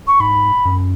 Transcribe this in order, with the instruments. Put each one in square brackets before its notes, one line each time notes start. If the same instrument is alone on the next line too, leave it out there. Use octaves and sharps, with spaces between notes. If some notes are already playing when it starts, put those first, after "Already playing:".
[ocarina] C#6
[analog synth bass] G#2 [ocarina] B5
[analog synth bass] F#2